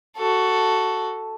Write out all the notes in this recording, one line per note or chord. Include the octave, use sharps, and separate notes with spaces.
F#4 A4